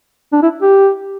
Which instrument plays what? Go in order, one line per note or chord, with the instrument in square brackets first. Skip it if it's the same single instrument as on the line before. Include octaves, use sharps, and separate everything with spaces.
[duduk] D4
E4
G4